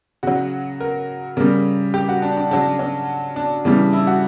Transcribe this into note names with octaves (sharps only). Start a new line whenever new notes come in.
C#3 F#3 F#4
A#4
C#3 G3 A#4
G4
F#4
D4
D4
C#3 F#3 D4
C#4
D4
C#3 E3 G3
E4
F#4